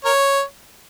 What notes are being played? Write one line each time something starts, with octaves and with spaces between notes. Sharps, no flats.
A#4 C#5